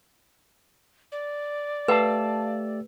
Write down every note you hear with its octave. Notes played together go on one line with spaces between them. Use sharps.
D5
A3 G4 B4 F5 A5 E6